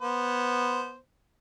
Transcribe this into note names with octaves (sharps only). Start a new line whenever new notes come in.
B3 C5